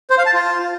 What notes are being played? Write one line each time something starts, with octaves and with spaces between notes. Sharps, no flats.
C5
F5
A5
F4